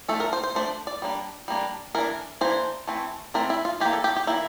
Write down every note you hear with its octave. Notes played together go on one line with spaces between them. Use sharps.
F3 A3 D4 A4
A#4
C5
C5
F3 A3 D4 C5
D5
G3 A#3 D4
G3 A#3 D4
E3 A#3 D4 A#4
E3 A#3 D4 C5
E3 A3 C4
E3 A3 C4 A#4
E4
F4
E3 G3 A#3 G4
A4
G4
G4
E3 G3 A#3 E4